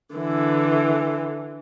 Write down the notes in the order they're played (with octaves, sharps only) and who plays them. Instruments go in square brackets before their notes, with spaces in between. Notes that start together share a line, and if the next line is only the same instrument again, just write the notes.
[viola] D3 E3